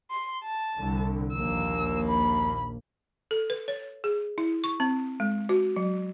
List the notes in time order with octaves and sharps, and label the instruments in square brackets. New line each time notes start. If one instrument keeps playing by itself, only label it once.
[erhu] C6
A5
[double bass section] C2 D3
[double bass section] A#1 D#2 A#3 [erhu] E6
[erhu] B5
[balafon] A4
B4
C#5
G#4
E4
C#6
C4
G#3
F#4
F#3